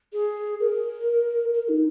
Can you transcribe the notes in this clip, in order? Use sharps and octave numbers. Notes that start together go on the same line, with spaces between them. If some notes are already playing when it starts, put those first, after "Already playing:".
G#4
A#4
A#4
D#4